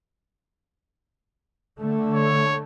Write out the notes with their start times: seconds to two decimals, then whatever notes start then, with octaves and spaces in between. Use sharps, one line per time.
1.80 D3 A3
2.14 C#5